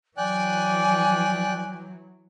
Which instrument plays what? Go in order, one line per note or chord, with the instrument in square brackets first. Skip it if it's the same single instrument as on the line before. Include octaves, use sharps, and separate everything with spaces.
[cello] E3 F#3 [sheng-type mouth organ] D5 G5 F#6 [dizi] G#5